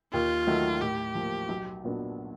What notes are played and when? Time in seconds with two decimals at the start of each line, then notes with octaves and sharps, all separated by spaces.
0.13 D#2 F4
0.47 D#3 F#3 A3
0.81 A2 G4
1.15 F3 A#3
1.49 B1
1.84 A#2 F#3 B3 D4